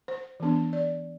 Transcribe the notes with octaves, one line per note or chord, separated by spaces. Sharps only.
C5
E3 B3 D4
D5